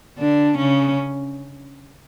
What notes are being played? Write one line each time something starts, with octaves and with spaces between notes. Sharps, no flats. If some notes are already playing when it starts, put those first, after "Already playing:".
D3 D4
C#3 C#4